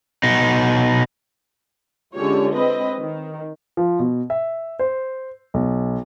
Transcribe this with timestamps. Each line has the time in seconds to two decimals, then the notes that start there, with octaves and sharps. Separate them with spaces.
0.23 B2 D#4
2.15 D3 G#3 C#4 F4 G4 C#5
2.52 C4 B4 D#5
2.98 D#3
3.77 F3
3.99 B2
4.30 E5
4.79 C5
5.54 B1